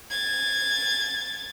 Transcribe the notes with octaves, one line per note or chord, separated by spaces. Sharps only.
G#6 A6